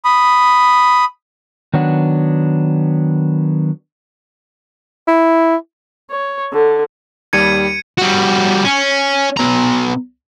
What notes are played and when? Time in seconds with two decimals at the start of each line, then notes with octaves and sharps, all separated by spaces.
0.05 B5 D#6
1.74 D#3 F#3 B3 D4 F#5
5.08 E4
6.11 C#5
6.52 D3
7.33 D#2 G3 G#6 C#7 D#7
7.98 G3 F#4
8.65 C#4
9.37 B2 A#5